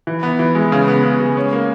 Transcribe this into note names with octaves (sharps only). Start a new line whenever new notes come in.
E3
B3
E3
G#3
C#3
B3
C#3
G#3
C#4
A#3